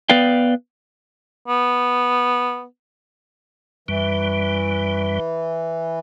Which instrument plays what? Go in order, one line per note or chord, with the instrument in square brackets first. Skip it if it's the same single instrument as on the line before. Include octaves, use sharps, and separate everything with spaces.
[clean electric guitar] B3 B4 D5 F5 G5
[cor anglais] B3
[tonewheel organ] F#2 G3 [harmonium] E3